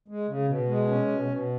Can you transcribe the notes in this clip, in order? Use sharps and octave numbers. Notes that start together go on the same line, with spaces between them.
G#3
C#3
B2
G#3
C#4
B2
B2